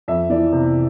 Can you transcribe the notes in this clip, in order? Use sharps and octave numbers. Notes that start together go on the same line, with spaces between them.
F2 E5
E3 D5
C3